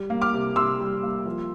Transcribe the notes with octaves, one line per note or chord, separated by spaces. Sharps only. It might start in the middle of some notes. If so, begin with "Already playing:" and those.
Already playing: G3
A#3
D6 F6
C3
C3 C6 E6
G3
A#3
F3